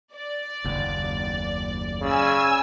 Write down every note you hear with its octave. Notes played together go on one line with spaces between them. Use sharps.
D5
F#1 D#2
C#3 G#5 E6